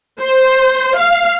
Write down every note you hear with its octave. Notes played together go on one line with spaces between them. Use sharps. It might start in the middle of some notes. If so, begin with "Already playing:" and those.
C5
F5